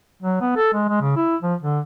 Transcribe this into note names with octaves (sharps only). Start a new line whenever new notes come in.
F#3
B3
A4
G#3
G#3
C#3
E4
F3
D3